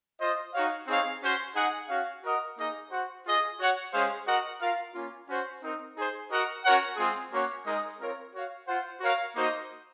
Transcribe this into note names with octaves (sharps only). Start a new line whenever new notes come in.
F4 C5 D#5
D#4 F#4 C#5 F5
C4 D#4 G#4 C#5 F5
C#4 F#4 C5
D#4 G#4 D#5 F#5
C#4 F#4 C#5 F5
F#4 A#4 D#5 F#5
A#3 D#4 G#4 D#5
F#4 C5 F#5
F4 G#4 D#5
F#4 C#5 F#5
G#3 C#4 G#4 C5 F5
F#4 A#4 D#5 F#5
F4 A#4 F5
A#3 C#4 F4
C#4 F#4 C5
C4 D#4 A#4
D#4 G#4 C5
F#4 A#4 D#5 F#5
C#4 F#4 A#4 C#5 F#5
G#3 C4 F4 G#4
A#3 C#4 F#4 C#5 F#5
G#3 D#4 A#4 D#5
C4 F4 A#4 C#5
F#4 C#5 F5
F4 C5 F#5
F#4 A#4 C#5 F5
A#3 D#4 F#4 C5 D#5